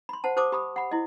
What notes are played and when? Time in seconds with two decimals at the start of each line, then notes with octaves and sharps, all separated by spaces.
0.09 B5 C6
0.24 C5 F#5 A5
0.36 G4 C5 A5 D6 D#6
0.52 G4 B5 D#6
0.76 F#5 B5
0.91 E4 D#5